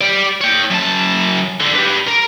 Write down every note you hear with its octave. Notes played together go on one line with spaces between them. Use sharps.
G4 D5
C#5 G5
F#2 A5
D3 G3
G4 B4
A#4